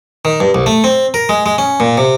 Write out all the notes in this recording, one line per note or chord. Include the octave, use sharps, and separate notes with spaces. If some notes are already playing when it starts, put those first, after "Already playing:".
D#3
G2
C2
A3
C4
A#4
G#3
G#3
C#4
A#2
C3